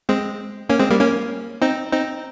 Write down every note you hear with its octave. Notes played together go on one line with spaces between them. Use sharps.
G#3 C4
A#3 C#4
G#3 C4
G3 A#3
A#3 C#4
C4 D#4
C4 D#4